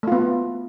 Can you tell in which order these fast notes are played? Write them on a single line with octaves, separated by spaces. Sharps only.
A3 F4 B3